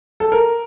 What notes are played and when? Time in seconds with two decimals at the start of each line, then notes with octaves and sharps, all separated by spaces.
0.20 A4
0.32 A#4